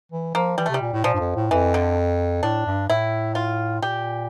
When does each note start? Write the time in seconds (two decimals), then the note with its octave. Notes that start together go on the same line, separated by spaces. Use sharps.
0.12 E3
0.35 F3 A#3
0.58 E3 G3
0.66 A3
0.69 C3 G3
0.81 A#2
0.93 A2
1.04 A#2 F3
1.14 G2
1.20 F2
1.36 A2
1.51 F2 E3
1.74 D3
2.43 A2 D4
2.66 G2
2.90 A2 E4
3.35 F4
3.82 A#2 G4